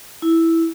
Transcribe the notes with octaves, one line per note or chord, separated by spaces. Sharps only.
E4